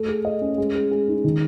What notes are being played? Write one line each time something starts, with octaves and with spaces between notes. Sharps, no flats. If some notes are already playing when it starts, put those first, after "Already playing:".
Already playing: A3
G#4
D#5
C#4
G#3
G#4
G#3
D#4
D#3